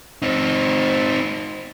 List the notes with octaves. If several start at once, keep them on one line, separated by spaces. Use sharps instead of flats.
C4 D#4